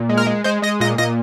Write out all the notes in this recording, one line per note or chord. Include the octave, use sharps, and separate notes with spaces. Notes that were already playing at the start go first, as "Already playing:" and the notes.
Already playing: A#2
G#3
A#4
G#3
G#3 C5
G#3 D#5
A#2 D#5
A#2 D#5